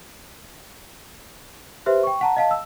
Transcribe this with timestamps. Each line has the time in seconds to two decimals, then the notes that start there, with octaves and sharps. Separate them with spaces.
1.86 G4 B4 C5 E5
2.03 G5 C#6
2.21 F#5 A5 A#5
2.37 D#5 F5 A5
2.51 E6